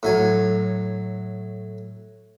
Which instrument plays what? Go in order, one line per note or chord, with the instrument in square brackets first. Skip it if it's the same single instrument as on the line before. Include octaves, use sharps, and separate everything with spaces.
[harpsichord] A2 F#3 G#5